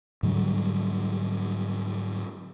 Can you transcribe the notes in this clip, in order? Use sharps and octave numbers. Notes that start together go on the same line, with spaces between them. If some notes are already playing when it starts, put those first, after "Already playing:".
G#2 D3 F#3 G3